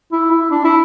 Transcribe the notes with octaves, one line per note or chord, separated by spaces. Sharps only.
E4
E4
D4
E4